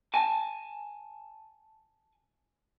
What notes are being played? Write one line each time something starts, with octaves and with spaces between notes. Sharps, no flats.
G#5 A5